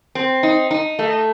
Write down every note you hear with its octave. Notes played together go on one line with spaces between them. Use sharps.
C4
D#4
D#4
A3